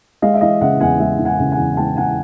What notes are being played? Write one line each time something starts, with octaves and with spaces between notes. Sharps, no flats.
G#3 D#5 F5
E5
E3 D#5 F5
C#3 E5 F#5
E2 F#5 G#5
G#3 E5 F#5
E3
F#5 G#5
C#3
F#5 G#5
E2
G#3 G5 A5
E3 F#5 G#5